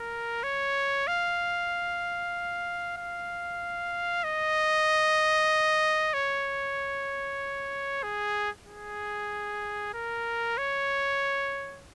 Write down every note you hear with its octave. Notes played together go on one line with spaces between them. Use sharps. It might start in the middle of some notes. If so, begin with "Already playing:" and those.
Already playing: A#4
C#5
F5
F5
D#5
C#5
G#4
G#4
A#4
C#5